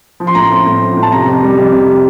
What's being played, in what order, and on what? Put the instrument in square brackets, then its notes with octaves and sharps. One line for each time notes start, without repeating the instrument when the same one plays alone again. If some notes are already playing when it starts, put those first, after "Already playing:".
[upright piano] F3
C6
A2 A#5
C6
C4
A2
F3
A2
A5
C3 A#5
F2
G3
F2
C3